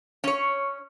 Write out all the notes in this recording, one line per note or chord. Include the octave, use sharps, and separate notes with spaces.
C#4 C#5